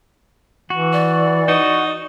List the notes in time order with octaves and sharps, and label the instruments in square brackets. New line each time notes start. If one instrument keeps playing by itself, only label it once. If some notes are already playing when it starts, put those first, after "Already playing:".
[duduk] E3 [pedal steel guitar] F#4
[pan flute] D5
[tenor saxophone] D#4 [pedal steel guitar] F#4